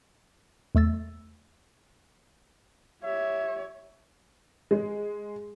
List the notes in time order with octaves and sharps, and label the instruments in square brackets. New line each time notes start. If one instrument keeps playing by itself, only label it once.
[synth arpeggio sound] E2 A3 E6 A6
[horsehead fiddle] G4 C#5 [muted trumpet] E5
[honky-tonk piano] G#3